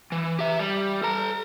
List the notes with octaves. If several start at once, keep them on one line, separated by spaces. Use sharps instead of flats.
E3
G4 E5
G3
A4 A#5